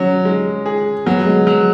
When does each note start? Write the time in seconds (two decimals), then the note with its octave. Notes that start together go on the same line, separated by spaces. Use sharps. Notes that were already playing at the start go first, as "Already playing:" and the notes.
Already playing: F#3 C#4
0.25 G#3
0.66 G#4
1.06 F#3 B3
1.26 G#3
1.47 F#3